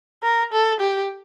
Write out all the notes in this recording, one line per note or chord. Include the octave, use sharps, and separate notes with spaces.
A#4
A4
G4